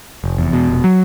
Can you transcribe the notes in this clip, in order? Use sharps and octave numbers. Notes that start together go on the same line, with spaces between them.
F1
E2
B2
F1
F#3